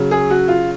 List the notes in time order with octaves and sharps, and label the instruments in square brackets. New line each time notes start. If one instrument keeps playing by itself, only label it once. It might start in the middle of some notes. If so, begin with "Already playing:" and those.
Already playing: [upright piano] C#3 F#3
G#4
F#4
F4